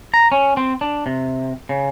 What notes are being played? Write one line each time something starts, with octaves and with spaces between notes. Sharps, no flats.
A#5
C#4
C4
D4
C3
C#3